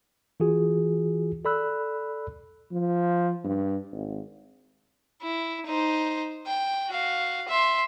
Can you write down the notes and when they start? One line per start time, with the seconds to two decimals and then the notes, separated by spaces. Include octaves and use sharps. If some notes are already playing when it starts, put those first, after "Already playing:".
0.40 E3 F4 F#4 G#4
1.45 A4 D5 B5 E6 F#6
2.72 F3
3.44 G2
3.92 G#1
5.22 E4
5.66 D#4 C5
6.47 G5
6.89 F#4 F5
7.48 E5 C6